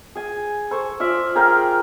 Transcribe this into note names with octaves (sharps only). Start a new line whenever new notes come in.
G#4 G#5
A4 C5 C#6
F4 D5 E5
G#4 A#4 F5 G5